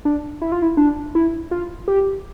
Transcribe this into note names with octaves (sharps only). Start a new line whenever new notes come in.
D4
E4
F4
E4
D4
E4
F4
G4